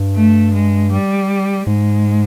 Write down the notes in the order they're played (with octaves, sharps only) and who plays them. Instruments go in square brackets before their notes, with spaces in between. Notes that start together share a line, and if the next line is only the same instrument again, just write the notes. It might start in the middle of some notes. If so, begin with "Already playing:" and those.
Already playing: [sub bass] G2
[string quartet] A3
G#3
G3
[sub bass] G#2 [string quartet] G#3